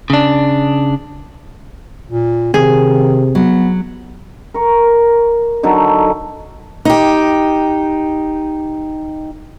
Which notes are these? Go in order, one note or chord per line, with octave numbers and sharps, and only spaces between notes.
C#3 D4
A#2
C3 D#3 G#4
F#3 B3
A#4 C#6
D3 F#3 D#4 A4
D#4 G4